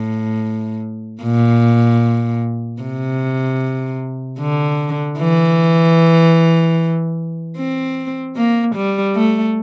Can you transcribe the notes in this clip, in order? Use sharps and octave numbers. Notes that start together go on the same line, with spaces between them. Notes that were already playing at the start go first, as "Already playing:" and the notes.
Already playing: A2
A#2
C3
D3
E3
C4
A#3
G3
A3